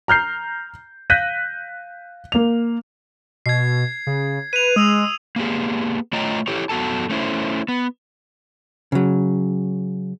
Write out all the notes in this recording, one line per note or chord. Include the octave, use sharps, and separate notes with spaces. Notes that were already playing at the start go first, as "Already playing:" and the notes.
A#5 F6 G6 C7
F5 F#6 G6 A#6 B6 D#7
A#3 F7
B2 G#6 C7
C#3
B4 D#7 F7
G#3 D#6 E6 F7
A#3 B3 G4 G#4
A3 F4 C#5 D#5 G5 A#5
E4 G4 A4 C#5
F#2 B3 F#4 A4 A5
A3 C#4 E4 C5
B3
C#3 F#3